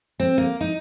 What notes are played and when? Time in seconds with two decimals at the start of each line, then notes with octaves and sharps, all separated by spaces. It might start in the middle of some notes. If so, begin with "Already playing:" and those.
0.20 C4
0.38 A#3
0.61 D#4